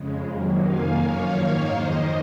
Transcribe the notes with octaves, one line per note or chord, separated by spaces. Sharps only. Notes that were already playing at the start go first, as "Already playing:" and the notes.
Already playing: F2 C#3 G#3
C3 D#3 F#3 A#3
F2 D#3 A#3 F5 G#5
F#2 F3 A#3 C#5 F5
G#2 D#3 A#3 C#5 F5
F2 D#3 A#3 C5 D#5